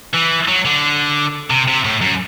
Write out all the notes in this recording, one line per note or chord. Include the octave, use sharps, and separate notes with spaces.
E3
F#3
D3
C3
C3
A2
F#2